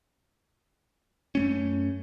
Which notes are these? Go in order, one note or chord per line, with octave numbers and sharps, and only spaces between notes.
F#2 A3 C#4